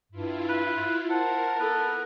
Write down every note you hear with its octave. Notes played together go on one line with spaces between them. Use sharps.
G2 E4 F4
B4
A#4 C5 F#5 A5
B3 A4 B4